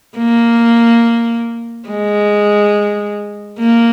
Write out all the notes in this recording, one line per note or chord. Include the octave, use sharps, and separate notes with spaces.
A#3
G#3
A#3